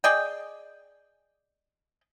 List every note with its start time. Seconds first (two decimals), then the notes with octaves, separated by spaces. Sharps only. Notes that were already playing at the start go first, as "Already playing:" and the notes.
0.04 G#4 D5 D#5 G5